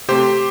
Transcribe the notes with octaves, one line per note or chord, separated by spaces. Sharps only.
C3 A3 C4 G4 C5